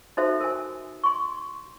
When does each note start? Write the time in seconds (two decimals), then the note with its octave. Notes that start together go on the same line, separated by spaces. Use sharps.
0.17 D#4 F#4 A4 C5 E5
0.40 A#4 C5 G#5
1.04 C6 C#6